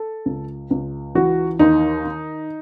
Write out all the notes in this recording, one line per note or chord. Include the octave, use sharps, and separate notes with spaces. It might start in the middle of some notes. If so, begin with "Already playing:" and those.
Already playing: A4
C#2
C#2
E3 F#4
D#2 D#4
D#3